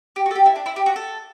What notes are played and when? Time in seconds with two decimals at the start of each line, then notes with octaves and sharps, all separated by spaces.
0.16 G4
0.26 F#4
0.31 A4
0.36 G4
0.46 E4
0.56 D4
0.66 E4
0.76 G4
0.86 F#4
0.96 A4